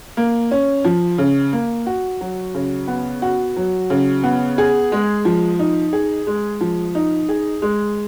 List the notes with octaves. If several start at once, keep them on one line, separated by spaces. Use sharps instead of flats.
A#3
C#4
F3
C#3
A#3
F#4
F#3
C#3
B3
F#4
F#3
C#3
B3
G#4
G#3
F3
D#4
G#4
G#3
F3
D#4
G#4
G#3